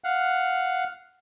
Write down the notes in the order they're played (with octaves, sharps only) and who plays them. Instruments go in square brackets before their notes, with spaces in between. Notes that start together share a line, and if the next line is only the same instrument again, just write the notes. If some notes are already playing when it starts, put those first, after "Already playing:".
[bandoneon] F5 F#5